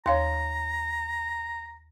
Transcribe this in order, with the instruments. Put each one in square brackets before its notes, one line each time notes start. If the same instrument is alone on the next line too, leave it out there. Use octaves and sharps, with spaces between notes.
[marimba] D#2 [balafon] C#5 F5 C6 [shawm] A#5